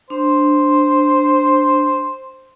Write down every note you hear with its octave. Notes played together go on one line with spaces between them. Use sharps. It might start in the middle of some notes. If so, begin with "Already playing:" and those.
D4 C5